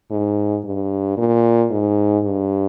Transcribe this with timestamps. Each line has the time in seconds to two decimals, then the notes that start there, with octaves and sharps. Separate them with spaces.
0.11 G#2
0.64 G2
1.17 A#2
1.71 G#2
2.24 G2